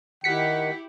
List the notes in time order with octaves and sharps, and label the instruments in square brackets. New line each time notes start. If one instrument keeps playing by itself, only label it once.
[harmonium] D#3 [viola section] E4 G4 [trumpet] F#5 [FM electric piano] B6 C#7